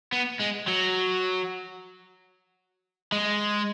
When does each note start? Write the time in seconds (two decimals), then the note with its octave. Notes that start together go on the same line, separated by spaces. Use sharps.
0.12 B3
0.40 G#3
0.67 F#3
3.12 G#3